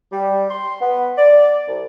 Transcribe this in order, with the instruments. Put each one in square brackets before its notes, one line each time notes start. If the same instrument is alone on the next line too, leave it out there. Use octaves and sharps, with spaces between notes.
[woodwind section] G3
C6
B3
D5
C2